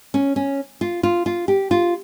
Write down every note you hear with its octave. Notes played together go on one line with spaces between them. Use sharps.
C#4
C#4
F4
F4
F4
G4
F4